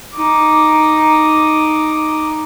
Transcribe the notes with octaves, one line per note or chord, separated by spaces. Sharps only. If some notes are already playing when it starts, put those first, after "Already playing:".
D#4 D6